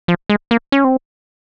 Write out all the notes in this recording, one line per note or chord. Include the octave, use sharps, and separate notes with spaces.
F3
G#3
A#3
C#4
C4